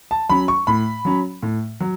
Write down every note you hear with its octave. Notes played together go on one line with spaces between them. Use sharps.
A5
F#3 C#4 B5
C#6
A2 B5
F#3 C#4
A2
F#3